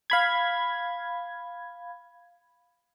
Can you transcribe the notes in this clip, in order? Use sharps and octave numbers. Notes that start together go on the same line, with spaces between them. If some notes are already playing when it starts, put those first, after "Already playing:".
F5 B5 G#6